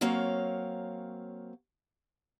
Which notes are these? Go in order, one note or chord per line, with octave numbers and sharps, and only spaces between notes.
F#3 A#3 C4 C#5 F5